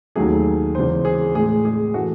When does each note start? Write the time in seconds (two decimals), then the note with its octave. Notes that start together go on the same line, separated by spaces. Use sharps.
0.15 D#2 D#3 F#3 A3 G#4
0.75 E2 C#3 E3 G#3 C5
1.05 G#4
1.35 A2 G#3 G#4
1.65 G#4
1.94 E3 A3 F#4